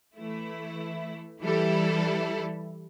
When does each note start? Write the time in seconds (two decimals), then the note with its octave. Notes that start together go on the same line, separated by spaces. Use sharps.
0.17 E3 A3 E4
1.41 E3 G3 E4 A4